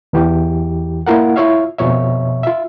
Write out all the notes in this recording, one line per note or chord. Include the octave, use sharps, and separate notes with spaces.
E2 E3 G4
A#3 E4 F4 A#4 F#5
E4 F4 C#5 E5 F5
F2 B2 F3 C#5 E5
F4 E5